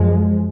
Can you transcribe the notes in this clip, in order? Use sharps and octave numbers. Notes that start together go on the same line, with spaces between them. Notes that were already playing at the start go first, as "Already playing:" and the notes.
Already playing: F#2 F3 G#3